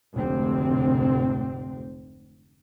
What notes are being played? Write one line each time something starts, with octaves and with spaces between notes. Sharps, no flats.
F1 D2 G#2 C3 C4